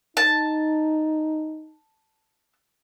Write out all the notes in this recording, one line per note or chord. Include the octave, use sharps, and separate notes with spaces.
D#4 A5